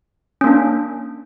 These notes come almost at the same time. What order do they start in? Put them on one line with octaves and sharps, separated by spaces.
C#4 A#3 D4